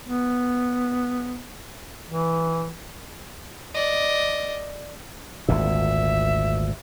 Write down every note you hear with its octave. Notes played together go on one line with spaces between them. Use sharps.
B3
E3
D5 D#5
G#1 D2 A#2 E5